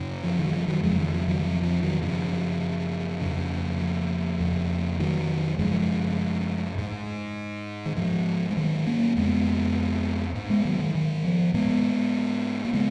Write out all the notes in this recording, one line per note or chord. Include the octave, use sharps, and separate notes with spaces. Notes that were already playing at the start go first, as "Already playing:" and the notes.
Already playing: F#2 C#3
F3
D#3
F#3
F3
D#3 F#3
F2 C#3 F3 G#3
D#3
F3
D#3 F#3
F3
F3
D#3 F#3
F#2 C#3 F3
F2 C#3
F3
F2 C#3
D#3 F#3
F#2 C#3 F3 G#3
G#2
D#3
G#2 F3
G#3
D#3 F#3
A#3 C#4
F2 C#3 G#3 B3
G#2
G#3 B3
D#3 F#3
D#3
D#3
F3
G#2 G#3 B3
A#3
C#3 G#3 B3